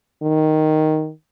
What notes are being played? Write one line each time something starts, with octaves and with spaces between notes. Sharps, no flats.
D#3